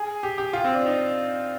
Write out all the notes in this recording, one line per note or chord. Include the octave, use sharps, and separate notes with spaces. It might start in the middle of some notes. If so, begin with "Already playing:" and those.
Already playing: G#4
G4
G4
F4
C4
D4
D#4